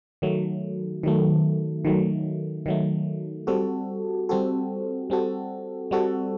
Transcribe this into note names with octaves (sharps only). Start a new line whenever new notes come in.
D#3 F#3 A3
D#3 F#3 A3
D#3 F#3 A3
D#3 F#3 A3
G3 C4 F#4 A4
G3 C4 F#4 A4
G3 C4 F#4 A4
G3 C4 F#4 A4